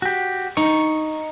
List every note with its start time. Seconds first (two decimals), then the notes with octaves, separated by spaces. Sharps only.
0.02 F#4 G4
0.57 D#4 C#6